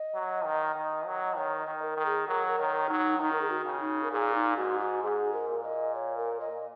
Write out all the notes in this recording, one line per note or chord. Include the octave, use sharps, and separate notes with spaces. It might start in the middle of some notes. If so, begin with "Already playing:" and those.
Already playing: D#5
F#3
D#3
D#3
F#3
D#3 C#5
D#5
D#3
A#4
D#3
G#4
F#3 A#4
A#4
D#3 C#5
F#3 D#4
D#3 D#4
A#4
G#4
F#4
C#3
D#4
A#4
A#2 G#4
D#4
G#2 F#4
F#4
G#2 G#4
A#4
A#2
D#5
C#5
A#4
D#5